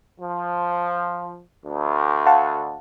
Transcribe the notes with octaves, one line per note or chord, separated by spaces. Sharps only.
F3
D2
F5 F#5 A5